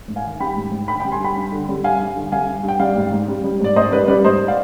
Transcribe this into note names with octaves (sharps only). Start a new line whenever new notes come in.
G#2
F5 G#5
D#3
G3 G5 B5
G#2
G#2
D3 G5 B5
G5 B5
G3
G#5 C6
G2 G5 B5
G2
D3
G3
G2 F5 G#5
G2
D3
G3 F5 G#5
G2
G2 G5
G3 D5 F5
G#2
G#2
G3
G3
G#2 D5
G#2 C5 D#5
G3 B4 D5
G3 B4 D5
G#2 C5 D#5
D5 F5